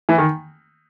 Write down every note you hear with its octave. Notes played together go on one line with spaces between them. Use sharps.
E3
D#3